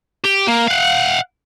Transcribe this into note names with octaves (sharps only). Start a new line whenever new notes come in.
G4
A#3
F5 F#5